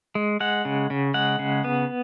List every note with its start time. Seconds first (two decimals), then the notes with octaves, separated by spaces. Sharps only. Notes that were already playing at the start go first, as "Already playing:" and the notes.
0.15 G#3
0.40 G#3 F#5
0.65 C#3
0.90 C#3
1.14 G#3 F#5
1.39 C#3
1.64 B3